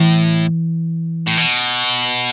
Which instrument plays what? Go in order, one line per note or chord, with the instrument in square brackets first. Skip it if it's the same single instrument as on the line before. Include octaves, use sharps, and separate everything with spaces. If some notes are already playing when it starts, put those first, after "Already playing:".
Already playing: [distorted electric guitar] A2 [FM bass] E3
[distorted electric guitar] A2
B2